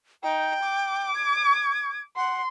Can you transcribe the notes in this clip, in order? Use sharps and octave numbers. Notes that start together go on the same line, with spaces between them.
D#4 G5
D6
G#6
F#5 C6